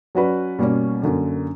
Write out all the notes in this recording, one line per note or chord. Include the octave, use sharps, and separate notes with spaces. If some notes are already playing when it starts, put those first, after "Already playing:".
F#3 C#4 F#4 B4 D5
B2 G3 A#3 C#4
F#2 D3 A#3